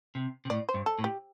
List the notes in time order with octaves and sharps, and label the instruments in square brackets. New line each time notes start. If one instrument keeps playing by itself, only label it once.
[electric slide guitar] C3
C3
[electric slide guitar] A2 [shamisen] D5
[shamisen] C5
[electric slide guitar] G2
[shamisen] A4
[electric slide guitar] A2
[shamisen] G4